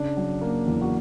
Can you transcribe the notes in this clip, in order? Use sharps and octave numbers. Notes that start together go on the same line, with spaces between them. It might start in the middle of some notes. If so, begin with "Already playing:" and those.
Already playing: C#3 D4
F#3
A#3
E2
F#4